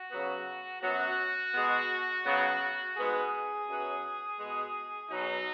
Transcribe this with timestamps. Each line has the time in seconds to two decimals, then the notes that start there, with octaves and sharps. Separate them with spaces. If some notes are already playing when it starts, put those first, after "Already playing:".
Already playing: F#4
0.10 C#3 F#3 B3
0.81 F#2 F#3 B3 F#4
1.52 B2 G#3 B3
2.24 C#3 F#3 B3
2.96 G#2 G#3 B3 G#4
3.68 F#2 F#3 B3
4.38 B2 G#3 B3
5.10 B2 F#3 B3 D#4